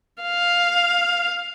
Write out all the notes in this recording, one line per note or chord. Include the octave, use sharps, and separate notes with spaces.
F5